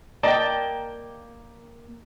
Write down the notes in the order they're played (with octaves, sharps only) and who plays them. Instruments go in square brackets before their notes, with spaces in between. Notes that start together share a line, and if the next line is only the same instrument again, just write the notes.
[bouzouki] A#3 G5 [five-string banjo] D5 D#5 A5